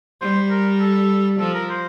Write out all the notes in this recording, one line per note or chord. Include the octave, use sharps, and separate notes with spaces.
G3 C5
A#4
A4
F3 A4
A#4
C5